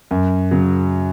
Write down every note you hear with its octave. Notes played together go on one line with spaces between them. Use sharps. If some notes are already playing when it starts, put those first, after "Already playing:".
F#2
C#3 F#3